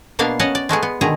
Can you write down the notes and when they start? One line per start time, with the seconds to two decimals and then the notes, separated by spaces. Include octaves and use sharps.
0.19 B2 A#3 B3 D4 F5
0.39 C#4 C#5 D#5 F#5 A5
0.55 D5
0.69 G#3 A3 B3 G#4
0.83 B3
1.01 B2 D3 D#3 G#4 A#5